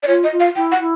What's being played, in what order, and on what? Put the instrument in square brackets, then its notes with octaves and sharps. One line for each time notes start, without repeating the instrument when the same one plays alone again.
[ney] D5
[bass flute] F4 [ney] C#5
[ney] D#5
[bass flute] F4
[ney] F5
[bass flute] E4 [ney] G5
[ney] F#5
[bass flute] E4